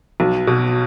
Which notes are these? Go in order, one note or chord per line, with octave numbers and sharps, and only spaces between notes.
B1
B2